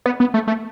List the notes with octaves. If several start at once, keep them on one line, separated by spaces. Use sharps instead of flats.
B3
B3
A3
A3